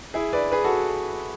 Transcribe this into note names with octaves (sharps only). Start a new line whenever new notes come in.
E4 G#4
B4 D5
G#4 B4
F#4 A4